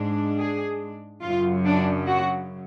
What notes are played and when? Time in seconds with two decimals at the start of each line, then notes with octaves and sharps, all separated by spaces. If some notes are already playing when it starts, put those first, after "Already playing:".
Already playing: G#2 G#3 D4
0.37 G#4
1.22 F#2 C#3 F#3 F4
1.65 D4
2.08 F#4